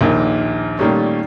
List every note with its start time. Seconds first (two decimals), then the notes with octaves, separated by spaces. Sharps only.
0.01 A#1 D#2 A#2 D#3 A#4
0.79 A#2 D#3 G3 A3 C#4